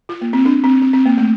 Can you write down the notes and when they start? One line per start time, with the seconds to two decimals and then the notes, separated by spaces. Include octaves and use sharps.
0.09 F4
0.21 A#3
0.33 C4
0.45 D4
0.64 C4
0.82 C4
0.93 C4
1.06 A#3
1.18 A3